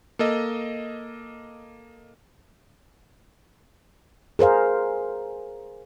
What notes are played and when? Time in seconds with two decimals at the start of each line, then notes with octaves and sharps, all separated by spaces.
0.19 A#3 A4 D#5
4.39 G#4 A#4 C5 F5